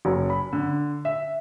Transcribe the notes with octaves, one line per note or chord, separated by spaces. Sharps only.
F#1
B5
D3
E5